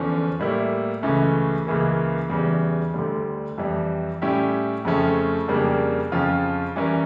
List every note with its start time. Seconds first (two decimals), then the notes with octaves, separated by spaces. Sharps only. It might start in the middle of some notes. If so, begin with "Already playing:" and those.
Already playing: E2 D3 F3 C#4
0.39 A2 G3 A#3 E4
1.03 C#2 C#3 E3 A3 C#4
1.67 C#2 C#3 E3 A#3
2.30 E2 C#3 E3 G3
2.94 D2 D3 G3
3.58 F2 E3 G3
4.22 A2 G3 C#4 E4 G4
4.85 F2 C#3 F3 A3 C#4
5.48 F2 C#3 G3 A#3 D4
6.12 F2 C#3 F3 C#4 F4
6.76 E3 G3 C#4 G4 A#4